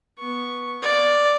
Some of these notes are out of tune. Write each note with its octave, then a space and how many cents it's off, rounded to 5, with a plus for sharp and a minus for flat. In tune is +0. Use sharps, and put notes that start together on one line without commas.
B3 -10 C#6 +0
D5 +0 F5 +25